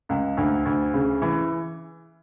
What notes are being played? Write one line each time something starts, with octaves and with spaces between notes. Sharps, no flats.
C#2
D2
D2
C#3
E3